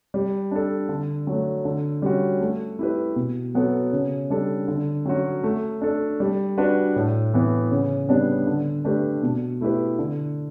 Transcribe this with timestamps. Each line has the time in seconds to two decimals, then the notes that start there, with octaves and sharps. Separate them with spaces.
0.14 G3
0.51 D4 A4
0.89 D3
1.27 F#3 A3
1.65 D3
2.02 G3 C#4 F#4
2.41 A3
2.79 E4 G4 B4
3.16 B2
3.55 F#3 B3 F#4 A4
3.93 C#3
4.30 G3 D4 A4
4.68 D3
5.06 F#3 C#4 F#4
5.44 A3
5.81 D4 A4
6.20 G3
6.58 D4 F#4 B4
6.96 A2
7.34 E3 B3
7.71 C#3
8.09 G3 B3 D4
8.47 D3
8.85 A3 D4 G4 B4
9.23 B2
9.61 A3 E4 G4 B4
9.99 D3